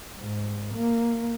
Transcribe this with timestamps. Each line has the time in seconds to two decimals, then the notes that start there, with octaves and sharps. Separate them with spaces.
0.17 G#2
0.75 A#3